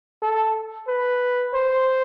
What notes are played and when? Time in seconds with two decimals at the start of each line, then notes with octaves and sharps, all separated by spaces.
0.22 A4
0.88 B4
1.54 C5